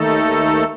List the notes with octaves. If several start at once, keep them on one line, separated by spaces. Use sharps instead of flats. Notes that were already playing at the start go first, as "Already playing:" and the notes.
Already playing: D#2 D#3 A3 D#4 A4